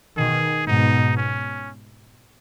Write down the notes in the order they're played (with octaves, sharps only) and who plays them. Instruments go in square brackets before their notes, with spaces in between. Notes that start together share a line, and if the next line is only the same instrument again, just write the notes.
[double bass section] B2 D#3 [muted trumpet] G#4
[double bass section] G#2 B2 [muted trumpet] D#4
[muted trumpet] C#4